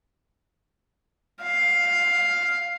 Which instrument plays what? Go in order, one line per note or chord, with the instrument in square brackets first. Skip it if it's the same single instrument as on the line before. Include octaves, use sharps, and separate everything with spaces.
[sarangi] F5